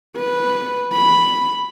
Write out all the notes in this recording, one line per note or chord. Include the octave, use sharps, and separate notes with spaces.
B4
B5